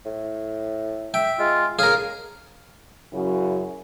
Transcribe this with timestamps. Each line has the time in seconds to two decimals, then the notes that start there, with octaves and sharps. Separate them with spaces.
0.06 A2
1.14 E5 G5
1.39 G#3 F4
1.79 C#3 G#4 A#4 F5
3.13 F#2 C#3 F#3 E4